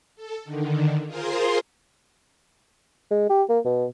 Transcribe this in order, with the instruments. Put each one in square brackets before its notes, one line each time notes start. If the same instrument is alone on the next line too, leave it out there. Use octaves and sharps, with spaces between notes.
[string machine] A4
D3 D#3
F4 G#4 A#4 C5 C6
[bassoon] G#3
G4
A#3
B2